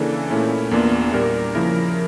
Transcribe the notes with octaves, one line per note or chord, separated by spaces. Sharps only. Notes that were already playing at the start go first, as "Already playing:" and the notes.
Already playing: C#3 E3 A#3 D4 A4
A#2 A3 C#4 E4
E2 E3 A#3 D4 F4
A#2 G3 D4 G4 A#4
C#3 F3 A#3 E4 A#4